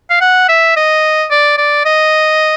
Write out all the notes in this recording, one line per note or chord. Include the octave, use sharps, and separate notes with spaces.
F5
F#5
E5
D#5
D5
D5
D#5